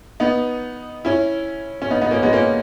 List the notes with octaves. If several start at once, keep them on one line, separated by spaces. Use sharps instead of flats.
B3 D#4
C#4 E4
C#4
B3 D#4
B3 D#4
A#3 C#4
G#3 B3
A#3 C#4